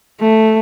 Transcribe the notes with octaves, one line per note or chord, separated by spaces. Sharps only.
A3